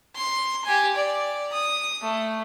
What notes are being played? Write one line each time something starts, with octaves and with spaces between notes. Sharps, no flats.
C6
G4 G#5
D5
D#6
A3